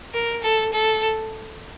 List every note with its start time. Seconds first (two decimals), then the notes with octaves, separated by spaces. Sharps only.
0.14 A#4
0.42 A4
0.72 A4